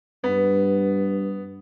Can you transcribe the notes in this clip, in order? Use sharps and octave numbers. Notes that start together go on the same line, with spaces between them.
G2 B3